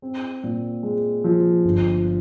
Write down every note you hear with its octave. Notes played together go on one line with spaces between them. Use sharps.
C4
A#2
G#3
F3
G1